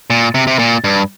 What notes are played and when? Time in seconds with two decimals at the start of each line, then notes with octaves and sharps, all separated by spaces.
0.10 A#2
0.35 C3
0.47 C3
0.59 A#2
0.84 G2